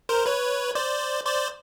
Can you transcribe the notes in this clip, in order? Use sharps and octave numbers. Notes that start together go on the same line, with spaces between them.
A#4 C5
B4 C#5
C5 D5
C5 D5